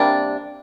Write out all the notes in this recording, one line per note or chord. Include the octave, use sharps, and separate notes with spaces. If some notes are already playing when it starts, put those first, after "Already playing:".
Already playing: C3 G3 A#3 D4